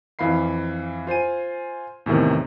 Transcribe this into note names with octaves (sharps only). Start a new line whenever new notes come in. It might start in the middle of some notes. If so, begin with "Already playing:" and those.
F2 E3 F5 B5 C7
F4 C5 G#5 D#7
E2 A2 C3 D#3